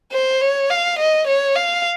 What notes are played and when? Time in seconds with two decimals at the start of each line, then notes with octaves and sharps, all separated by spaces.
0.12 C5
0.41 C#5
0.70 F5
0.99 D#5
1.28 C#5
1.56 F5